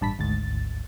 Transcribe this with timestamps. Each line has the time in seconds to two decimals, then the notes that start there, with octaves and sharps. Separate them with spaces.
0.01 A1 G2 A5 B5 B6
0.18 G#1 D2 G#2 A6